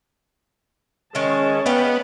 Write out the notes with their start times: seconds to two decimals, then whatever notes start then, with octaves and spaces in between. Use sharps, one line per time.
1.15 D#3 G#3 C#4 A5
1.66 B3 D5 F5 G5